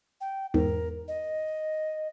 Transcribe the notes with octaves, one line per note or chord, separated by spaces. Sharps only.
G5
E2 G#2 A#4
D#5